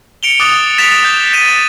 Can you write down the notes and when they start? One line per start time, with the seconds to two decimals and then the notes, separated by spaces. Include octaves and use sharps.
0.23 C#7 D7 F7 G7
0.40 D6 D#6 F#6 A6 G7
0.78 A6 B6 C#7 D7 E7 F7
1.01 G6 E7
1.33 G6 A6 D#7 E7